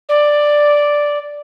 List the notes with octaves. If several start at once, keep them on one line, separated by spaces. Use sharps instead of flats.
D5